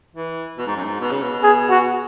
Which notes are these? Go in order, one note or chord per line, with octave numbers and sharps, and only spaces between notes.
E3
B2
G#2
F#2
G#2
B2
C#3
B2
G#4
F#4